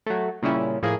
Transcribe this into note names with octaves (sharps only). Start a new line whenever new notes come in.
F#3 A3
A#2 C#3 G3 C#4 E4
A2 F3 A#3 G#4